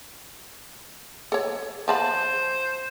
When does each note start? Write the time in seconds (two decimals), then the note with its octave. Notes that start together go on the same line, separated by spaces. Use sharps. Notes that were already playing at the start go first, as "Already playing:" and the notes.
1.32 A4 C#5
1.88 F3 C5 A5 B5